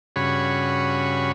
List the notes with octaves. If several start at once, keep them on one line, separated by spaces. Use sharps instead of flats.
G2 C#3 F#4 G#4 C#5 B5